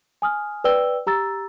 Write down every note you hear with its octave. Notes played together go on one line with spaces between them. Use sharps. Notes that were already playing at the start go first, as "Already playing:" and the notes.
G#5 D#6 F6
B4 D5 G5 E6 G7
G4 A#5 E6 A6